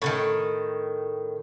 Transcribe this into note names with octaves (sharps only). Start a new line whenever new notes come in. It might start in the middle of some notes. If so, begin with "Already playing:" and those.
A2 D3 D#3